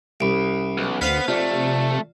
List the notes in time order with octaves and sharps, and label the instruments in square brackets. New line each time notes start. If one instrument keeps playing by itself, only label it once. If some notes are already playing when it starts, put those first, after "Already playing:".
[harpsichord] C2 [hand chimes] C#4 B5 D7
[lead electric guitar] B1
[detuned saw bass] D2 [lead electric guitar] B3 [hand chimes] C5 F6 B6 [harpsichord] F5
[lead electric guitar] F2 A3 [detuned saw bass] C3 [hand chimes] F4 D5